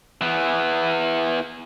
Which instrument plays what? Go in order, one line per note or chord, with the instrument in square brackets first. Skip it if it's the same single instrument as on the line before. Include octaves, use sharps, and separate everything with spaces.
[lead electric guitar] E3 B3